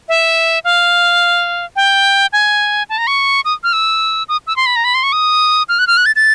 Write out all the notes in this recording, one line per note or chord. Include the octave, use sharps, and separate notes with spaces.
E5
F5
G5
G#5
A5
A#5
C#6
D#6
F6
E6
D#6
E6
C6
B5
A#5
B5
C6
C#6
D#6
F6
F#6
F6
F#6
A6
A6